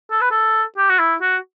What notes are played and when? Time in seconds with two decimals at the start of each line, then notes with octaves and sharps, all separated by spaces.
0.11 A4
0.21 B4
0.31 A4
0.78 G4
0.90 F#4
0.99 E4
1.21 F#4